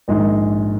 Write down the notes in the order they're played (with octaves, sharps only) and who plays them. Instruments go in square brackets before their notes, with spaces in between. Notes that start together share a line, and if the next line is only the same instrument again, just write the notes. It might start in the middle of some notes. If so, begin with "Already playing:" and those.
[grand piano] A#1 G#2 D#3 G#3